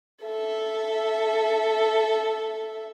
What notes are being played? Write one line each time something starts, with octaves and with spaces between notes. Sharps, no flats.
A4 E5